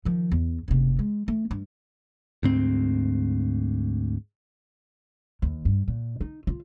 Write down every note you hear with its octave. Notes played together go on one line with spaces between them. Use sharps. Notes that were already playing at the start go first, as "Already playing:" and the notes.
D#3 F3
E2
F#1 C3
G#3
A3
G2
D2 G#2 C4
D#2
G2
A#2
D#4
F4